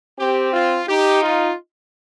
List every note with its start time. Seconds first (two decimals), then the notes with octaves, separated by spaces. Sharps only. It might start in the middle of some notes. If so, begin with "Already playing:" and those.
0.19 C4 G4
0.53 F4
0.89 D#4 G4
1.23 F4